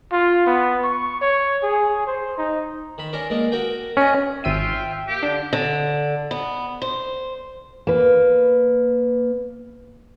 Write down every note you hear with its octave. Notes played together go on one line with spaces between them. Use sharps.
F4
B3
C#6
C#5
G#4
C5
D#4
D#3 B5
C#4 D4 A#4
G#3 A#3 D4
F#4 A#4 G5
C#4 D4 D#5
G#1 F4 E5 G5 E6 D#7
A#3 G4
D3 D4
D3
B3
C5
A#3 B4